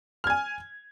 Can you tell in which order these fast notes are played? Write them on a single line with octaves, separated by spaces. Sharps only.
F6 G#6 G#5